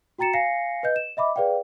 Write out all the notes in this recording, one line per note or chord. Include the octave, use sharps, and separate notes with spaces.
F#4 G5 A#5 A6 C#7 E7
F5 G#5 A#6 C7 C#7
B4 D#5 G6
E7
D#5 E5 B5 D6
G#4 B4 D5 F5 G5